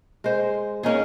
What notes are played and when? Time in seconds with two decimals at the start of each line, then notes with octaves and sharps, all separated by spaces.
0.24 G#3 C5
0.83 A#3 C#4 D#4 G#4